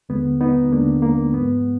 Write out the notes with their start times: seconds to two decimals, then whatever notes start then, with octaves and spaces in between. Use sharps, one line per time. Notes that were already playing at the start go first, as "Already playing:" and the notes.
0.09 D#2 D3 G#3 B3
0.41 B3 D#4
0.71 D#2 D3 G#3 A#3 D4
1.02 A#3
1.34 G#2 F3 G#3 B3